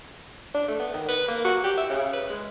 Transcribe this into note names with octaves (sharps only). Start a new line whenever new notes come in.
D4
A3
B3
D#3
B4
A#3
F#4
G4
E5
C#3
B4
G#3